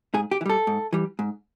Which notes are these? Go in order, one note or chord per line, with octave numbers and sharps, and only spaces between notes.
G#2 G#4
G4
E3
G3 A4
G#2
E3 G3
G#2